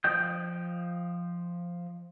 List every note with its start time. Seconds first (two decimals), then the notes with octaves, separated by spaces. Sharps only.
0.04 F3 D#5 G5 G6